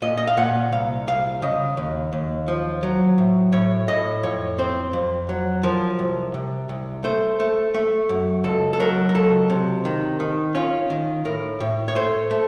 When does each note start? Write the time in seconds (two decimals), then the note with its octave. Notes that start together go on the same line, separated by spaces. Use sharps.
0.02 A#2 D#5
0.17 D#5
0.27 F5
0.37 A#2 F#5
0.72 C2 F5
1.07 C2 F5
1.42 C#3 D#5
1.77 D#2
2.13 D#2
2.48 F3
2.83 F#3
3.18 A2
3.52 A2 C#5
3.88 A2 D#5
4.23 F2 C#5
4.58 C4 C5
4.93 F2
5.29 F#3
5.63 F3 A#4
5.99 C2
6.34 C3
6.69 C2
7.04 A3 C5
7.40 A3
7.74 A3
8.09 F#2
8.44 C#2 A4
8.73 A4
8.80 F#3 A#4
9.09 A#4
9.15 C#2 A4
9.50 C3
9.85 D#3
10.20 D#3
10.55 C#4 F4
10.90 D#3
11.25 A2 A#4
11.60 A2
11.88 C#5
11.95 A3 C5
12.31 A3